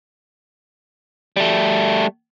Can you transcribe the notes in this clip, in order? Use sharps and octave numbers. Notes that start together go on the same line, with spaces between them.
G3 A3